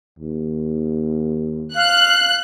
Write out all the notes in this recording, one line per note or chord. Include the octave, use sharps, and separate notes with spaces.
D#2
F5 F#6